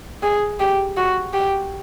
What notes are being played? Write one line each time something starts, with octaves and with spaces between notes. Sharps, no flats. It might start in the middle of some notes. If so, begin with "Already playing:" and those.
G#4
G4
F#4
G4